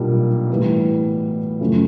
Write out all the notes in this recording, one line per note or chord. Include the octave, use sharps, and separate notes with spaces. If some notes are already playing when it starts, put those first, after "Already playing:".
Already playing: B1 A#2 G3 A#3 D4
A2 E3 G3 B3 E4
F#2 C#3 F3 A3 C#4